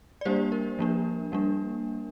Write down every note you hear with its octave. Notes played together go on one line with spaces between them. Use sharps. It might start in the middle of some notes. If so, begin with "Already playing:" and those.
D5
G3 A#3 D4 G4 C5
A#4
F3 A#3 D4
G3 A#3 D4